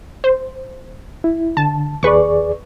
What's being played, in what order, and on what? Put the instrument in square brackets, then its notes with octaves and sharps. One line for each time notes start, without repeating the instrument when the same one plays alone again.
[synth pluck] C5
[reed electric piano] E4
[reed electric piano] D3 [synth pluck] A5
[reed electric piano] D#2 G#4 D5 [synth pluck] B4 C#6